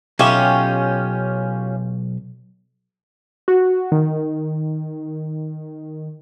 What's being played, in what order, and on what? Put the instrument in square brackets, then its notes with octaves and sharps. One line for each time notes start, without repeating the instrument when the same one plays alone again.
[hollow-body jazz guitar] B1 E5 [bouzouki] C#4 F4 G4
[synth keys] F#4
D#3